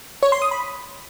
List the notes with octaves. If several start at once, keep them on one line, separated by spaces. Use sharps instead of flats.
C#5
C6
D#6
B5